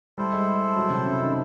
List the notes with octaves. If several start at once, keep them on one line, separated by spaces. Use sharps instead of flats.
G3 E4 A4 C5
G#3
G#3
F#3
C3
C#3
D#3